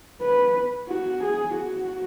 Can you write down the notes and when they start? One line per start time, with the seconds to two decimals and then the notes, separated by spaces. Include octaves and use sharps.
0.21 B4
0.89 F#4
1.23 G#4
1.56 F#4